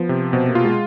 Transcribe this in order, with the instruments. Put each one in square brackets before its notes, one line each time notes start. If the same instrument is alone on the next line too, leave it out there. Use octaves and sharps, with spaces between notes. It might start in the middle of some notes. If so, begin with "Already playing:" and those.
Already playing: [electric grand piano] F3 [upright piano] B3
[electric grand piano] C3
[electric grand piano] B2 [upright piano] C4
[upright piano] A#3
[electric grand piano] F4
[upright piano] G#3